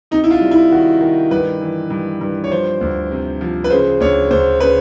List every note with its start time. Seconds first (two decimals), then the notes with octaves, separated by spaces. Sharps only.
0.11 C3 D#4
0.24 E4
0.31 F4
0.41 G3
0.51 E4
0.72 D#3 F#4
1.01 D#3
1.31 G2 B4
1.61 E3
1.91 G2
2.21 G2
2.44 C#5
2.51 F3 C5
2.81 D2
3.12 C3
3.41 F3
3.64 B4
3.70 C#3 C5
4.00 D2 C#5
4.31 D2 C5
4.60 C#3 B4